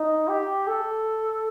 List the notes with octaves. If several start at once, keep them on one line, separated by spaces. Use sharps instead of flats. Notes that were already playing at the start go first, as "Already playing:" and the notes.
Already playing: D#4
G4
A4